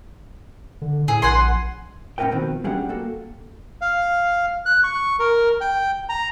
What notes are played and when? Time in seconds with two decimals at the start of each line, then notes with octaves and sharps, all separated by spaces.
0.81 D3
1.08 A2 G#4
1.22 A#1 F#5 G#5 C6
2.18 A2 C#4 E4 A#4 B4 G5
2.31 B2 D#3 F3 C4 B4
2.64 G3 C#4 D4 G4 G#4 F#5
2.89 A#3 F#4 A4
3.81 F5
4.66 F#6
4.84 C#6
5.19 A#4
5.61 G5
6.09 A#5